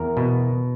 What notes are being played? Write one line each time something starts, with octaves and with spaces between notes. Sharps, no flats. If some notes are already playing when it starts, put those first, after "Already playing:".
Already playing: E2 A#4
B2